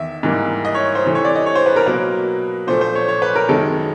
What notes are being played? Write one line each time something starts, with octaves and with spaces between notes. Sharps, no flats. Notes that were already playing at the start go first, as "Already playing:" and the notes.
Already playing: E2 D#3 E5
G#2 E3 G3 A#3
D#5
C#5
C5
C3 E3 A3
C#5
D5
D#5
C#5
C5
B4
A#4
B2 F#3 A#3 B4
A#2 F3 A3 C5
C5
C#5
C#5
B4
A#4
F#2 D#3 G#3 A4